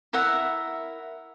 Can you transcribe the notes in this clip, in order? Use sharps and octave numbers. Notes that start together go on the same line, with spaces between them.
E4 A#4 E5 F#5